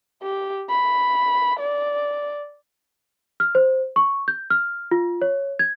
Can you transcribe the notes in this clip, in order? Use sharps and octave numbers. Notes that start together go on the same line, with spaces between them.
G4
B5
D5
F6
C5
C#6
G6
F6
F4
C#5
G#6